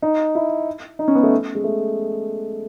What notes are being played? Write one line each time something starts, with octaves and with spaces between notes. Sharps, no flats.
D#4
E4
D#4
C#4
B3
A3
G#3
A3